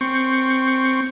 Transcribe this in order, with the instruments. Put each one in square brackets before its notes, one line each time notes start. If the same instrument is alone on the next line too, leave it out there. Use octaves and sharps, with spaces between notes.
[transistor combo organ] C4 C#6